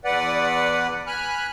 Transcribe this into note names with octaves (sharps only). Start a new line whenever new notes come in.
E2 B4 D5 F#5
G#5 B5 F6 F#6